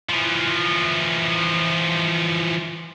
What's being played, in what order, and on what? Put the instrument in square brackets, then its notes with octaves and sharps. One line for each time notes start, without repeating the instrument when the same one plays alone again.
[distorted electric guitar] E3 F3